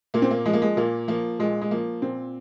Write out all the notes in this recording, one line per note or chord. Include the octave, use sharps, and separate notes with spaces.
A#2 A#3
C4
A#3
F3 G#3
A#3
G#3
A#2 A#3
F3 A#3
A#2 G#3
G#3
F3 A#3
A#2 C4